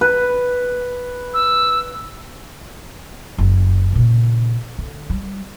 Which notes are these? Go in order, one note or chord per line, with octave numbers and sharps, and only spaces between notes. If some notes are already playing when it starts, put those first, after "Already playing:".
B4
E6
F#1
A#2 C#3
D3
G3